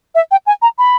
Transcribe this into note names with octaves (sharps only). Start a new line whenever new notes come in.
E5
G5
G#5
A#5
B5